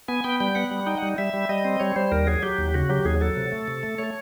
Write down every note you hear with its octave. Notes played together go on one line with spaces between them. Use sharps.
B3 G#5
B3 G5
G3 G5
B3 F#5
G3
D#4 G5
G3 F#5
G3 E5
G3
G3 D#5
C4
G3 C#5
G3 C5
D#2 A#4
F#3 G#4
F#3 G4
D#2
C#3 F#4
F#3 G4
D#2 G#4
F#3 A4
C3
A3
C3
A3
A3 C#5